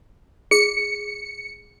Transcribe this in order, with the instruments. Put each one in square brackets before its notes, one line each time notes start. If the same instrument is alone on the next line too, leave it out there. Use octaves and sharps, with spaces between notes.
[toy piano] G#4 [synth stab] C#7